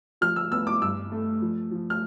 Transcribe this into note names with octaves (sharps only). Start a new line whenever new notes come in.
F3 F6
E6
B3 E6
D6
G2 E6
A3
F3
F3
F6